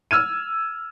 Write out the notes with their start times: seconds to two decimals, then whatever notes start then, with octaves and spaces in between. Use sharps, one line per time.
0.11 E6 F6 G#6 D#7